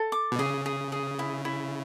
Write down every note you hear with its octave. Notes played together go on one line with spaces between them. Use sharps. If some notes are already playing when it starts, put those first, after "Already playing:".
Already playing: A4
D6
B2
C#3 G#4
G#4
G#4
E4
E4